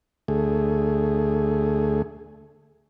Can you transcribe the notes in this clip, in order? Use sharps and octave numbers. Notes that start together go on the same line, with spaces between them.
D2 A3 G#4